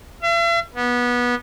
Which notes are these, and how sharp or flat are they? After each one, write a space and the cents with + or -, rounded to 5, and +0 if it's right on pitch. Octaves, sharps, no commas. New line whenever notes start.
E5 +45
B3 -20